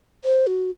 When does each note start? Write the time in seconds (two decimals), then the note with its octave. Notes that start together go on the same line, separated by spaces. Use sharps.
0.24 C5
0.47 F#4